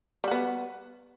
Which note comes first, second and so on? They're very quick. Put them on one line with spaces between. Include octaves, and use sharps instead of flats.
G3 F#4 B3